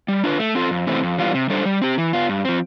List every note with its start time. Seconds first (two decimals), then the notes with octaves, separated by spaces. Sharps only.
0.08 G3
0.24 D4 F4 B4
0.39 A3
0.55 C4 F4 A4
0.71 F2
0.87 C3 E3 A3 C4
1.03 F2
1.18 E3 G3 B3 F4
1.34 C3
1.50 G3 D4 A4 C5
1.65 G3
1.82 C4 G4
1.98 E3
2.13 B3 F4
2.29 G2
2.45 F3 C4